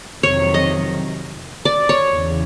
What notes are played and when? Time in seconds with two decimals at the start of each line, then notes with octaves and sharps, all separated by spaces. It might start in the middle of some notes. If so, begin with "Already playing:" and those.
0.23 F2 C3 D#3 F#3 C#5
0.54 D#5
1.65 D5
1.89 C#5
2.13 E2 C#3